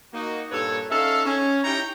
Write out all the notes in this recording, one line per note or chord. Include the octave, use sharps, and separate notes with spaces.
A#3 D#4 F#4
G2 A#2 A4 B4 C#5
C#4 D#4 A4 E5 F5
C#4
D#4 E4 G4 C#5 G5 A#5